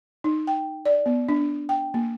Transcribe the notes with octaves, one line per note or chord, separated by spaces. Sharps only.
D#4
G5
D5
B3
D4
G5
A#3